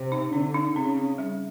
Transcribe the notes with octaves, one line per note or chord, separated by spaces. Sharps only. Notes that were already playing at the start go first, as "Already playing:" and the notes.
Already playing: C3
D#4
D3 C4
D#4
C#3 C4
C4
G3